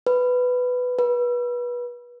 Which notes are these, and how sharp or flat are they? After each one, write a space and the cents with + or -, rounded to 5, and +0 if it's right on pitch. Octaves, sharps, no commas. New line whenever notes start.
B4 +10
B4 -25